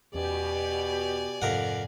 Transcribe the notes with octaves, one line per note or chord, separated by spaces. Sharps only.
E2 B2 C#4 G4 D5 G#5
F2 G#2 C3 A#4 F#5